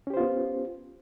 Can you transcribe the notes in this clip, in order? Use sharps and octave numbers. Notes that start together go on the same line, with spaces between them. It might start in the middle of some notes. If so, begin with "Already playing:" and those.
B3 C#4 F4 G4 C5